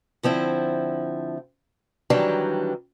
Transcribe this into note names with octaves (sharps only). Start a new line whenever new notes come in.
D3 F3 C4 E4
D#3 E3 F#3 G3 D4